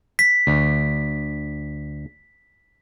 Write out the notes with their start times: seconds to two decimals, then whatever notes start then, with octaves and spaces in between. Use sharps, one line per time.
0.19 B6
0.47 D2